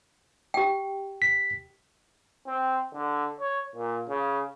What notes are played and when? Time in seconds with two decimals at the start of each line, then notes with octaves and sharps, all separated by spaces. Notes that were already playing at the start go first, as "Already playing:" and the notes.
0.54 G4 G5
1.22 B6
2.47 C4
2.93 D3
3.40 C#5
3.75 A#2
4.09 C#3